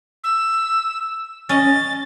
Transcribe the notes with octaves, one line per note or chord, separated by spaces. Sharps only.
E6
C#4 D#5 A6